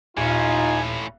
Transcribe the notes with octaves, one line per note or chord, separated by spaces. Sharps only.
D#1 A2 C#4 D#4 F4 G#5